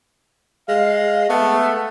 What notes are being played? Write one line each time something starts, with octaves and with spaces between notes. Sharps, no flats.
G#3 F5
A3 B3